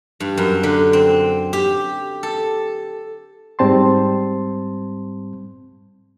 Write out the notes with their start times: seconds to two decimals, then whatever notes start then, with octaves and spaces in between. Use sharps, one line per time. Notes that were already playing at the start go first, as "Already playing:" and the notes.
0.20 G2
0.37 F#2
0.63 D3
0.93 C4
1.53 G4
2.23 A4
3.59 G#2 G3 C4 A5 C6